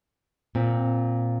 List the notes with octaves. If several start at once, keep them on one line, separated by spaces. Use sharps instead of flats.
A#2 C4